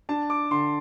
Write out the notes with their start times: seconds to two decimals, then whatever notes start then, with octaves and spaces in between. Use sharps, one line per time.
0.09 D4 A5
0.30 D6
0.51 D3 C6